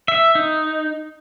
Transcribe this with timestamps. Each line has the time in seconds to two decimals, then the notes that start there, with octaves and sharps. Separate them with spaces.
0.08 E5
0.35 D#4